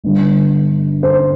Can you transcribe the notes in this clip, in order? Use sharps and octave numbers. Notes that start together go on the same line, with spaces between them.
G1 G2 D3
C5